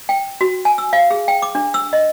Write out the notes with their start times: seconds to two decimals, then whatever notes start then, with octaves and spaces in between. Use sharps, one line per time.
0.09 G5
0.41 F#4
0.65 G#5
0.78 E6
0.93 F5
1.11 G#4
1.28 G5
1.42 D6
1.55 D4
1.74 E6
1.93 D#5